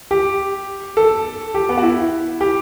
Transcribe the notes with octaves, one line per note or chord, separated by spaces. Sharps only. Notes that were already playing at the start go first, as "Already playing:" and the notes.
G4
A4
G4
B3
F#4
E4
G4